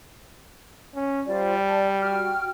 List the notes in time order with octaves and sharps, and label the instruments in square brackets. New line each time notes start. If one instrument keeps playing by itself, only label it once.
[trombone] C#4
[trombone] G3 [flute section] F4 C5 D5
[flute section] D5 A5
F#4 G5 F6